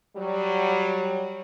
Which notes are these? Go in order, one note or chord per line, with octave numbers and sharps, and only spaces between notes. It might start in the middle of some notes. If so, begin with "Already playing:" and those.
F#3 G3